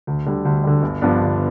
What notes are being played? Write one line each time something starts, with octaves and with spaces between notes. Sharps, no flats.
D2
D3 G3
D2
D3 G3
G1
G2 F3 B3 D4
G1